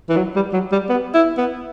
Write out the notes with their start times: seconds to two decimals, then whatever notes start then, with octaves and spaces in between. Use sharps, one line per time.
0.10 E3
0.17 F#3
0.36 G3
0.53 F#3
0.72 G3
0.89 B3
1.14 E4
1.38 B3